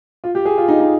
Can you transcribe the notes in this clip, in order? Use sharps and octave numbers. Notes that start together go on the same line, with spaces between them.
F4
G4
G#4
F4
D#4
D#4